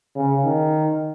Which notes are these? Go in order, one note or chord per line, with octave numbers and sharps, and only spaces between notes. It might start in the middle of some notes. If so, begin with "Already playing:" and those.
C#3
D#3